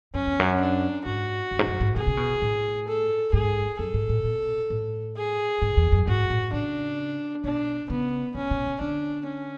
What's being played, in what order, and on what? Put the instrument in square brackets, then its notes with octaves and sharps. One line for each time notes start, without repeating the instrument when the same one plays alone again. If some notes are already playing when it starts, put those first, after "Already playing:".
[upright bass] F#2 [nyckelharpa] C#4
[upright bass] E2
F#2
[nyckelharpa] D4
[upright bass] G#2 [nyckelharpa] F#4
[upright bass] F#2
G#2
F#2
G#2
[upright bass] B2 [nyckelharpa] G#4
[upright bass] C#3
B2
A2
[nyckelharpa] A4
[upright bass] G#2 [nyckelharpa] G#4
[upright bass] F#2 [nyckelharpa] A4
[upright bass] G#2
A2
B2
A2
[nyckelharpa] G#4
[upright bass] G#2
E2
F#2
[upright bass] G#2 [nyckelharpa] F#4
[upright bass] A2
[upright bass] C#3 [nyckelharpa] D4
[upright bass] B2 [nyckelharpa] D4
[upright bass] C#3 [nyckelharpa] B3
[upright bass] C#3 [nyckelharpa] C#4
[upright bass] B2
C#3
[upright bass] D3 [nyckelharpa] D4
[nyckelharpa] C#4